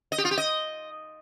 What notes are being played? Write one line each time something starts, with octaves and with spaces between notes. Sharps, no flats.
D#5
G4
F4
G4
D#5